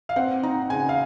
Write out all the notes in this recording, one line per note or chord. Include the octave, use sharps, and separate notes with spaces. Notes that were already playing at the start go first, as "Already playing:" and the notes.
F5
C4 F#5
D#4 A#5
C#3 G#5
F5